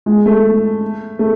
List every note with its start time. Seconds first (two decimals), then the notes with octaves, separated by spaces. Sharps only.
0.06 G#3
0.26 A3
1.19 A3